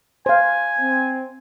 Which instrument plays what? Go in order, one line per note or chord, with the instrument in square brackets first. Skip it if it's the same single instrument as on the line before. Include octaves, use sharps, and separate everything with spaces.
[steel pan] C5 F5 [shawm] G#5
[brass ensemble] C4